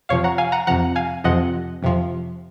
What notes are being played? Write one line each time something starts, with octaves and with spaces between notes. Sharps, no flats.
F2 C3 F3 C#5 F5
F#5 A#5
F5 G#5
F#5 A#5
F2 C3 F3 F#5 A#5
F5 G#5
F2 C3 F3 D#5 F#5
F2 C3 F3